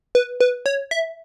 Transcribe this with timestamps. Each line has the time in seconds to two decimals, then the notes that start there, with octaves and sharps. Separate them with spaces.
0.15 B4
0.40 B4
0.66 C#5
0.91 E5